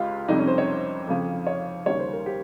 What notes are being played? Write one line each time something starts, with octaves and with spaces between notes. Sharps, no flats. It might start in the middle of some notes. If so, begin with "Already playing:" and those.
Already playing: C#2 C#3 G#3 F4 G4
F2 C3 G3 D#4
C#4
C5
C#5
F2 C#3 F3
C#5
D#2 C#3 G3 C#5
C5
A#4
G4